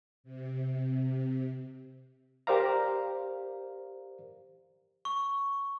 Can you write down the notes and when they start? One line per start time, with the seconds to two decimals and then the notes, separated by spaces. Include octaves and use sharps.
0.24 C3
2.47 G4 A#4 C5 D5 F5 A#5
5.05 C#6